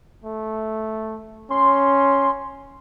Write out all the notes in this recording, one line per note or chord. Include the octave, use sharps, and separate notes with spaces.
A3
C#4 C6